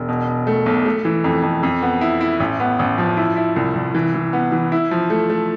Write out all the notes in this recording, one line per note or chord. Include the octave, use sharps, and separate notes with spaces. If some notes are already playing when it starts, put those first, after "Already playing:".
Already playing: E1
B2
B2
A3
B1
A3
E3
F2
F2
F2
B3
E4
E4
A1
B3
A1
F3
E4
E4
C2
C2
E3
E3
B3
E3
E4
F3
A3
A3